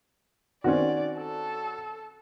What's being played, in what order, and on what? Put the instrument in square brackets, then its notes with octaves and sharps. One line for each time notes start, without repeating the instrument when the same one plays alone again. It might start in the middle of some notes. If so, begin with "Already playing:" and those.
[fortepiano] D#3 C4 C#4 [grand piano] F#4 [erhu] D5
[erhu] A4